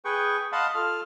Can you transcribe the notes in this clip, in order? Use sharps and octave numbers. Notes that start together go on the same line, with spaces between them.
G#4 B4 G5 C#6
D#5 F5 F#5 A5 B5 C6
F4 A4 F5 F6